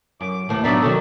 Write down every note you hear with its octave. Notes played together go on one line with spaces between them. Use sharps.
F#2 D6
D#2 A2 E3
F#3 B3 D4 D#4 D5 E5
D#3 F#3 A4